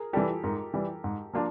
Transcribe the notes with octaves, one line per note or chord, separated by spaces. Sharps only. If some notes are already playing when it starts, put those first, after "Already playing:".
Already playing: G#4 A#4
E3 G3 G4 A4
G#2 G#4 A#4
E3 G3
G#2
F3 A#3 D4 F4